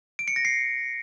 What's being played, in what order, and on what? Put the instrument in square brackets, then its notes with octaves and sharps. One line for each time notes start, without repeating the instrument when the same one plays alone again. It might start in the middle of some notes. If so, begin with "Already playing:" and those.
[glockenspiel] D7
C#7
A#6
C7